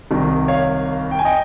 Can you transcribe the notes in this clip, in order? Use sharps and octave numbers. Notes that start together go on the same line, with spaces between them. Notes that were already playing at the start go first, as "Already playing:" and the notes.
C2 C3 D#3 G3
C#5 F5
G5
G#5
D#5 G5